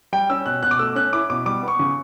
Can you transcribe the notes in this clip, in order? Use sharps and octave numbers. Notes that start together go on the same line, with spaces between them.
G3 G5
C#4 E6
B2 F#6
B2 F#6
D6
A3 E6
C#4 F#6
E4 D6
B2 D6
G3 D6
B3
C#6
C#3